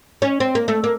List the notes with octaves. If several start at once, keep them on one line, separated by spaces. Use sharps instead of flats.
C#4
C4
A#3
A3
A#3